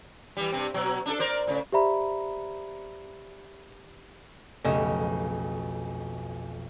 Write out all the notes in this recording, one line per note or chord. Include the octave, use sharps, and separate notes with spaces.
E3 G3
G2 C3 C4
B2 F#3
D4 D#4 A4
A#4 C5 D5
A2 C#3
G4 C5 D5 E5 A#5 B5
B1 F2 C#3 A3 G4 D#5